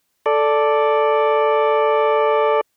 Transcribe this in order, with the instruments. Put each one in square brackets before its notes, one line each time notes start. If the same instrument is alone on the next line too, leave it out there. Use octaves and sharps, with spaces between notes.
[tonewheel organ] A4 D5